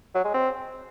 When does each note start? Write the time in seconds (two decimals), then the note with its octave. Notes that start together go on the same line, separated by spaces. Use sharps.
0.15 F#3
0.24 G#3
0.34 C4